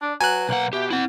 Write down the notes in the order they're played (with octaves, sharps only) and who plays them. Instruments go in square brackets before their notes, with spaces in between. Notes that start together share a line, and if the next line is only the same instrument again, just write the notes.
[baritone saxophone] D4 [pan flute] D5
[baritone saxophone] F#3 [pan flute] B4 [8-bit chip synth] G#5 F#6
[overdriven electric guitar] B1 F#5 [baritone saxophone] A#3
[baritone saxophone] B2 [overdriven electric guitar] G4 [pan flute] E5
[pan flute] C4 [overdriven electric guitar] E4 F#5